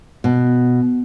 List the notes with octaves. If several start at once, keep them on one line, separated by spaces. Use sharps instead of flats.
B2